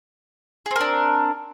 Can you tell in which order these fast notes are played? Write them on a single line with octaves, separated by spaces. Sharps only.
G#4 C4 A#4 D4